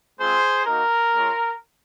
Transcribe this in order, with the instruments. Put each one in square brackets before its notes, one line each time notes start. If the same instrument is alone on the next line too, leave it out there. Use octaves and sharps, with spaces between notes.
[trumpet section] G#3 C4 F4 G#4 C5
A#3 D#4 F#4 A#4
G#3 C#4 F4